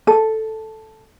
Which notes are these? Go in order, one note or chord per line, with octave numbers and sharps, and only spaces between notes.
A4